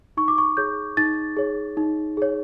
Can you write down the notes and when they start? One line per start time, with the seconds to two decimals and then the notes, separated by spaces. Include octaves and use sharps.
0.17 D#4 C#6
0.28 D6
0.38 C#6
0.57 G#4 C#5 G6
0.97 D#4 A6
1.37 G#4 C#5
1.77 D#4
2.17 G#4 C#5